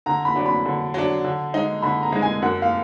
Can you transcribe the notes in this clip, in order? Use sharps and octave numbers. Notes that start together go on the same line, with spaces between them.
D3 A#5
B5
F#3 D4
B5
D3
F#3 D4
D3
G#3 D#4
D3 B5
A#5
G#3 D#4
G#5
F#2 F#5
F5